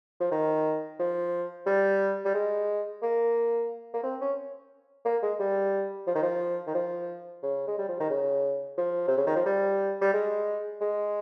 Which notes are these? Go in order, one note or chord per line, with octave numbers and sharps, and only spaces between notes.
F3
D#3
F3
G3
G3
G#3
A#3
A#3
C4
C#4
A#3
G#3
G3
F3
D#3
F3
D#3
F3
C#3
G#3
G3
F3
D#3
C#3
F3
C3
C#3
D#3
F3
G3
G3
G#3
G#3